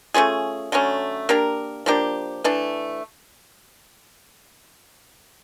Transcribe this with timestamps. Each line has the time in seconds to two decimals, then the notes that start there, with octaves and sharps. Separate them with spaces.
0.14 A3 C#4 F4 G#4
0.72 D3 F#3 A3 C#4
1.29 A#3 D4 G4 A#4
1.86 F3 A#3 D4 G4
2.44 E3 A3 D4